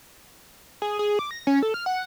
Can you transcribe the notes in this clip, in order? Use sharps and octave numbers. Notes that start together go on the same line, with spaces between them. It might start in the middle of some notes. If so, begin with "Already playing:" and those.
G#4
G#4
D6
A#6
C#4
A4
F6
F#5